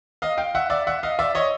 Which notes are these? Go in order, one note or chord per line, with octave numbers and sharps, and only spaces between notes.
D#5 F5
F5 G5
E5 F#5
D5 E5
E5 F#5
D#5 F5
D5 E5
C#5 D#5